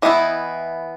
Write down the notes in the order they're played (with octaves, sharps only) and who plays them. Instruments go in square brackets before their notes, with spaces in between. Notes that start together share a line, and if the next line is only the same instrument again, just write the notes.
[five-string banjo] E3 B3 E4 D#5